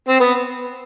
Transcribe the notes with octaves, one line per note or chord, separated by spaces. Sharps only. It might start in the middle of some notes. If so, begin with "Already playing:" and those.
C4
B3